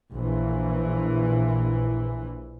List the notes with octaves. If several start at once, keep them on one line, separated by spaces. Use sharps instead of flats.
A#1 E3